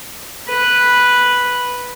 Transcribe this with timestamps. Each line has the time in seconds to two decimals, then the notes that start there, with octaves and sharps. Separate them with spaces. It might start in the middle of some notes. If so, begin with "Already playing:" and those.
0.48 B4